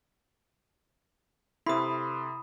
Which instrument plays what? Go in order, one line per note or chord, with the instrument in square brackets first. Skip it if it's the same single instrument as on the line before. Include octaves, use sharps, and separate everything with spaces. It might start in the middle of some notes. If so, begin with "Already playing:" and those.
[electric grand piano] C3 A4 C6 [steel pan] E4 [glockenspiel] B5 D#6